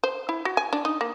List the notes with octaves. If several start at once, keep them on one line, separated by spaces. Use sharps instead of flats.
C5
E4
F#4
G#5
D4
D#4
A#3